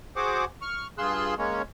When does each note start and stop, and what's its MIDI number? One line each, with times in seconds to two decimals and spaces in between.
0.16 0.45 66
0.16 0.45 68
0.16 0.45 72
0.16 0.45 78
0.16 0.45 86
0.62 0.87 85
0.62 0.87 89
0.98 1.34 43
0.98 1.34 65
0.98 1.34 68
0.98 1.34 84
0.98 1.34 88
0.98 1.34 90
1.38 1.62 56
1.38 1.62 58
1.38 1.62 61
1.38 1.62 73